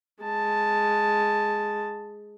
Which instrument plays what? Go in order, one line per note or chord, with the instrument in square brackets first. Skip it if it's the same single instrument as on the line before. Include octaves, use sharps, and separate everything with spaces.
[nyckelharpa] G#3 A5